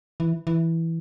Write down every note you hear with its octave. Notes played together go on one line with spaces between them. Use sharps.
E3
E3